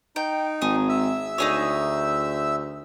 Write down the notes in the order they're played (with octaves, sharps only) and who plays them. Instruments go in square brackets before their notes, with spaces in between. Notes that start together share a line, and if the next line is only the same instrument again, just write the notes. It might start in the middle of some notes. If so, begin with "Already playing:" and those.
[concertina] D#4 [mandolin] G5
[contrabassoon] G#1 [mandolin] G#4
[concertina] E5 E6
[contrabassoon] D2 [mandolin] D#4 G#4 C#5